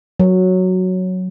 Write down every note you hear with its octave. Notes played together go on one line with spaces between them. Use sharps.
F#3